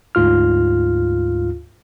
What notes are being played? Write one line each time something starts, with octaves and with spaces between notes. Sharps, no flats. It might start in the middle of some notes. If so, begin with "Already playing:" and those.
D2 G#2 F4 F6